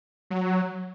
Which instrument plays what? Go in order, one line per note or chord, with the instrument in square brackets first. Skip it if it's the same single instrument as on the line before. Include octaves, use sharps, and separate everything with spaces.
[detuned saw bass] F#3